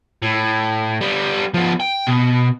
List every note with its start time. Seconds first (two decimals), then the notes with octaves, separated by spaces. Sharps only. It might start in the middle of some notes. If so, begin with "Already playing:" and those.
0.23 A2
1.01 G3 B3
1.54 F3 B3
1.80 G5
2.07 B2